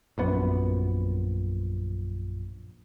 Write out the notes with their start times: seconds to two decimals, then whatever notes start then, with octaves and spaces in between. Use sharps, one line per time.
0.18 A#1 F#2 B3